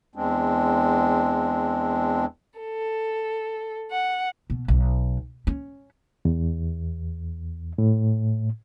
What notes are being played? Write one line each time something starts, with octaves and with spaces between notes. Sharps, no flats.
E2 G#3 C4 D4
A4
F#5
B2
B1
C#4
E2
A2